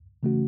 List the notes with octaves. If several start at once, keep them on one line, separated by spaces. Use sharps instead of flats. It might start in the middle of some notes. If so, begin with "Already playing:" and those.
C#3 E3 A3 C#4 F#4